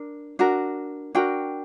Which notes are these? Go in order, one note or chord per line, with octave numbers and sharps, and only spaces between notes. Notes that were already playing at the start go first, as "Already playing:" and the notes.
Already playing: D4 A#4
D4 F#4 A#4
D4 F#4 A#4 G5